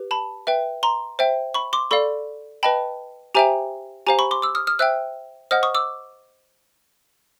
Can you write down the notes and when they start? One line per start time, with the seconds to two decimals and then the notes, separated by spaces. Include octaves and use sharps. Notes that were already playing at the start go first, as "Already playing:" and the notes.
Already playing: G4 B4
0.11 A5 B5
0.47 B4 E5 G5
0.83 A#5 C6
1.19 C5 E5 G5
1.54 B5 C#6
1.73 C6 D6
1.91 A4 D5 F5 B5 C#6
2.63 B4 D#5 G5 A5 B5
3.35 G4 C5 E5 G5 G#5 A#5
4.07 G4 C5 F5 G#5 A#5
4.19 B5 C#6
4.31 C6 D6
4.42 D6 E6
4.55 D#6 F6
4.67 D#6 F6
4.79 C5 E5 G5 E6 F#6
5.51 C5 D#5 F#5 D#6 F6
5.63 C#6 D#6
5.74 D6 E6